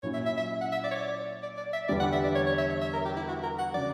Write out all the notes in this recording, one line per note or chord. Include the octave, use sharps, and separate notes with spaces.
A#2 F#3 C#4 E4 C#5
E5
E5
E5
F#5
E5
D5
C#5
D5
D5
D5
E5
E2 D3 G3 D5
F#5
E5
D5
C#5
C#5
E5
C#5
E5
A#4
G4
E4
F#4
A#4
F#5
C#3 F#3 D5